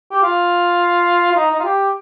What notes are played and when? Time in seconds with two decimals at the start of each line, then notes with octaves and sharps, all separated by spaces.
0.11 G4
0.22 F4
1.31 F4
1.36 D#4
1.50 D#4
1.59 F4
1.64 G4